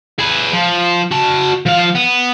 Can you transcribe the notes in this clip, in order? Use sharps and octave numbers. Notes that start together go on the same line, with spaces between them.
G#4 B4
F3
F#4 A5
F3 F5
B3